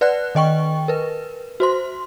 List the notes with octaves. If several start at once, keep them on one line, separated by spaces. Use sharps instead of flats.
B4 D5 F#5 F#6
D#3 D#5 G5 C#6
A#4 B4
F#4 C5 C6